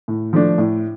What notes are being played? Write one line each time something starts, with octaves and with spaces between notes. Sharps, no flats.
A2
F3 A3 D4
A2